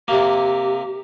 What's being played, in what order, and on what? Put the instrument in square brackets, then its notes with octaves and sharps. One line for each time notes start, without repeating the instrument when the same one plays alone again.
[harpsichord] C3 A#3 [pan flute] G4